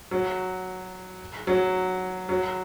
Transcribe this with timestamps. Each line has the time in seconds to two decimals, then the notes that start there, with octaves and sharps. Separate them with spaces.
0.11 F#3
1.47 F#3
2.29 F#3